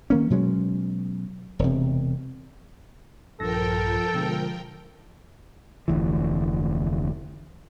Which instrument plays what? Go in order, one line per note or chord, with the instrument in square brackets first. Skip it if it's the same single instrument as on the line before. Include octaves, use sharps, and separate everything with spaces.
[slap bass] D#3 A#3 C#4
B2 F#3 G#3 C#4
E1 C3
[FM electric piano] A#1 G2 A#6 [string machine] F3 A#4 G5 [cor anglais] A4
[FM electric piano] B2 D3 G#3
[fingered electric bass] F1 D2 E3